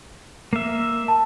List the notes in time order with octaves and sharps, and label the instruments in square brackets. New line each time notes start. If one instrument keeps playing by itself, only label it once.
[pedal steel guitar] A#3 E5
[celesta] A5